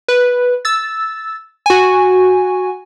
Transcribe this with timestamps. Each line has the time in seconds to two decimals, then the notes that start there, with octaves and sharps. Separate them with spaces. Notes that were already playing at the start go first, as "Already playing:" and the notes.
0.08 B4
0.65 E6 A6
1.66 F#4 G#5